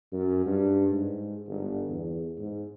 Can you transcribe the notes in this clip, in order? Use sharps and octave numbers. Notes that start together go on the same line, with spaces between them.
F#2
G2
G#2
G1
E2
G#2